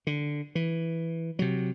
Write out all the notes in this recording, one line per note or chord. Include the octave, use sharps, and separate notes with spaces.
D3
E3
C3 F#3